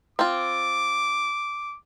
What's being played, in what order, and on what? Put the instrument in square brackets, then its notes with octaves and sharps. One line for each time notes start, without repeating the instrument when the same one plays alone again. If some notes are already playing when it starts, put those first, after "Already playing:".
[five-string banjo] C4 F4 [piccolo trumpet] D6